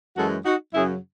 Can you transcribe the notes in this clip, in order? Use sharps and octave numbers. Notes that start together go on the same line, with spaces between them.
F#2 E3 G#3 F#4 A4
D#4 F#4
F#2 C#3 F#3 E4 G#4